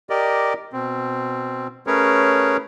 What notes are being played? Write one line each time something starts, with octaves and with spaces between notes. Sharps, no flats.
G4 A#4 D5 D#5
B2 C4
A3 C#4 G#4 A#4 B4 C#5